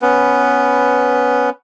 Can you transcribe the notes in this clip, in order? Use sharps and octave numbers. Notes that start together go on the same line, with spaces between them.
B3 C#4 B4